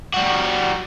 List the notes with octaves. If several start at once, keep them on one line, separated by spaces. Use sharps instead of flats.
G3 F#4